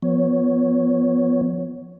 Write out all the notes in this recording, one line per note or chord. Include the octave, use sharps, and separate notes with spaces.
F3 B3 C#5